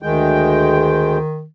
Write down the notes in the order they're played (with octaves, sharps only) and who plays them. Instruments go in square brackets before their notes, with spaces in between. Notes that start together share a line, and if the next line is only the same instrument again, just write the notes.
[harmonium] D2 G#3 G5 [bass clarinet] D#3